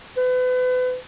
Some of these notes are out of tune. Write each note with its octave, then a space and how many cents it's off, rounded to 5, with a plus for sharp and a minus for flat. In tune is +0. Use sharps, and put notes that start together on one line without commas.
B4 +35